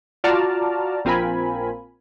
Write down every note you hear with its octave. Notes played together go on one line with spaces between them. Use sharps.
F4 F#4 D5 A5 A#5 F6
A#1 C4 F4 A#4 G#5 B5